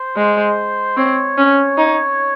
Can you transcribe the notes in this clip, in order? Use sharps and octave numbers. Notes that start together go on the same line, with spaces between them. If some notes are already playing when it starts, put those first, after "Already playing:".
Already playing: C5
G#3
C4 C#5
C#4
D#4